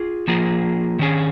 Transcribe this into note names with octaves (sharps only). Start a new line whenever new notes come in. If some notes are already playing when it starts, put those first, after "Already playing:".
Already playing: F4 G#4
F3 A#3 F4 G#4
D#3 C#4 G#4